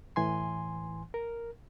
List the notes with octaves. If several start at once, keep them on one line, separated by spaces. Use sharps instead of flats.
A2 E3 G#5 C6
A#4